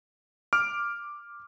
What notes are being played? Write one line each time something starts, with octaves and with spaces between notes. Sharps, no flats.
D6 F6 D7